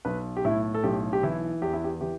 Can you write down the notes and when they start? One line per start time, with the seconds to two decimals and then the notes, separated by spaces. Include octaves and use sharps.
0.05 B1 B4
0.37 G4
0.45 A2 E4
0.74 A4
0.83 B1 G4
1.13 G4
1.23 E3 E4
1.62 E2 G4
1.73 E4
1.84 G4
2.01 E3 G4